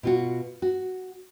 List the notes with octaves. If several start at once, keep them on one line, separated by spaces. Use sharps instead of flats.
B2 F4 F#4
F#4